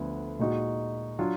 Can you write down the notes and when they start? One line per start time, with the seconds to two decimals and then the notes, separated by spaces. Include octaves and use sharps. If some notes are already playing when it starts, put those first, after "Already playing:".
Already playing: D2 D3 F3 B3
0.39 A#2 G#3 D#4 F#4
1.19 F#3 D4 F4